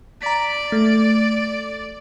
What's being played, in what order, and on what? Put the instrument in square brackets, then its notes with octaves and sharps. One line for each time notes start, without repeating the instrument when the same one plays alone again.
[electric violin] D5 [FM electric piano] A#5 B6
[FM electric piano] A3